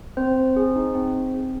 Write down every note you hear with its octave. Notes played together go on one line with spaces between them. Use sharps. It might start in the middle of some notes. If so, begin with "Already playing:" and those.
C4 C5
C4
G#4
D#4
C4
C4
G#4